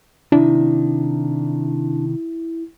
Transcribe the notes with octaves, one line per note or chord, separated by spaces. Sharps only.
C3 D#3 D4 E4